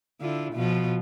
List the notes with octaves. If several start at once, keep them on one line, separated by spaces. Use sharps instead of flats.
D3 E4 F4
B2 F3 F4